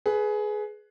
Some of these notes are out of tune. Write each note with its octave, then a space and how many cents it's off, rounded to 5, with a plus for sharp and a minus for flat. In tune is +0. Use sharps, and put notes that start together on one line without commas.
G#4 +20 B4 +0